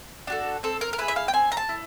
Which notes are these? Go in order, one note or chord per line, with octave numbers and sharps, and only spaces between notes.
D4 F#4 A4
C4 A4
A#4
A#4
E4 G#4 B4
E5
F5
G5
C4 G#5
A#5
A5
E4